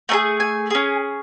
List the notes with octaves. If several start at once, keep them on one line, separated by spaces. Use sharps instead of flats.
A3 D4 G#4 G#5
G#5
C#4 G#4